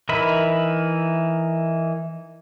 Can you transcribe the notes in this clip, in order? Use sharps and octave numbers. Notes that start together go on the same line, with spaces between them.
E3 D#4 A#4 E5 B5